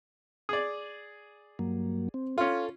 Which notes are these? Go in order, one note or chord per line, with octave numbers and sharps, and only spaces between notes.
G#4 D5
G2 F#3 A#3
C4
C#4 F4 A4